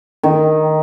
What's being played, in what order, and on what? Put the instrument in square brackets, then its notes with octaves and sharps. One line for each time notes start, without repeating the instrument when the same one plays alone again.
[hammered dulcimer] D#3